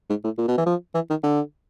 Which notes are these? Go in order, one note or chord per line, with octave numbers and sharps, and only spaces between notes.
G#2
A2
A#2
B2
E3
F3
E3
D#3
D3